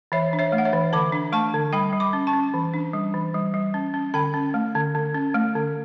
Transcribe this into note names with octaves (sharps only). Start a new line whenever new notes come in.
E3 C#5 E5
D4
C#5 E5
A3
F#5
C#5 E5
E3
D3 B5 D6
D4
A3 A5 C#6
D3
G3 G5 B5
G3
B5 D6
C#4
A5 C#6
C#4
E3
D4
G3
E3
G3
G3
C#4
C#4
D3 G5 B5
C#4
A3
D3
D3
C#4
A3
D3